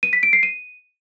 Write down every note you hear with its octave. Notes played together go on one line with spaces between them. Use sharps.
D#7
B6
D7
C7
D#7